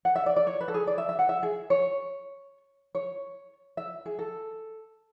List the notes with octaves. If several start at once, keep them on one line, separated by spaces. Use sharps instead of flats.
F#5
E5
D5
D5
C#5
B4
A4
G#4
D5
E5
E5
F#5
E5
G#4
C#5
C#5
E5
G#4
A4